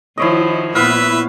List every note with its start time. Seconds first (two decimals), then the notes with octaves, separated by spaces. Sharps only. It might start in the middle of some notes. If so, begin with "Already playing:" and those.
0.18 D#3 F3 E4 F#4 C#5 D#5
0.75 A#2 B3 E4 B4 E5 F5